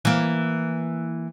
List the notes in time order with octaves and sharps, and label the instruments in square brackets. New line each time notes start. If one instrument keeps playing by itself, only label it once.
[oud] E3 A#3